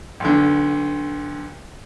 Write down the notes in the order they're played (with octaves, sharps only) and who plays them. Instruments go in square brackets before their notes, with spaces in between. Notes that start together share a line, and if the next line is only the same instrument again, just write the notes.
[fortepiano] B1 D3